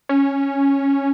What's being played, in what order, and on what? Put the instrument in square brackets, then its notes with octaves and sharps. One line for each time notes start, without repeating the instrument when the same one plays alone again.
[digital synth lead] C#4